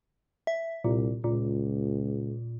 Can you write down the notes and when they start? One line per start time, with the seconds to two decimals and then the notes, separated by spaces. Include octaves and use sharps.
0.47 E5
0.84 C2 A#2
1.24 C#2 A#2